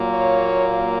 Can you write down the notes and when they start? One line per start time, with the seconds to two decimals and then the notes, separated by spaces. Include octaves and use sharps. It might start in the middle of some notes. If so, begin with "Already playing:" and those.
Already playing: A#2 F#3 A#3
0.10 C#5